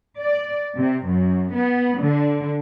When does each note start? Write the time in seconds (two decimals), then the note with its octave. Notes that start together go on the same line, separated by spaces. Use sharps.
0.18 D5
0.76 C3
1.06 F#2
1.54 B3
2.02 D3